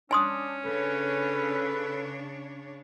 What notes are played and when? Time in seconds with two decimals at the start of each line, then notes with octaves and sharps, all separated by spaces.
0.11 C#4 D4 G#5 C6 D#6
0.65 C#3 D4 A4 B4 C#5